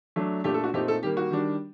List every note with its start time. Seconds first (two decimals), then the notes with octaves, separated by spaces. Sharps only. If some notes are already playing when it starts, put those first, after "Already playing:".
0.16 F#3 A3 D4
0.44 A#2 A3 D4 G4
0.54 A4
0.64 F#4
0.74 A#2 A3 C4 D#4 G4
0.88 A4
1.03 D#3 G3 A#3 G4
1.17 F#4
1.31 D#3 G3 D4